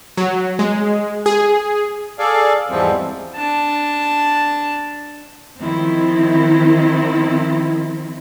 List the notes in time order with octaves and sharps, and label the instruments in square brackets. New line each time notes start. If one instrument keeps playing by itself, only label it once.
[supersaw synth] F#3
G#3
G#4
[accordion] G#4 A4 D5 F5
E2 G#2 E3 F3 G3 C4
[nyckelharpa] D4 A5
[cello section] D#3 F3 C4 E4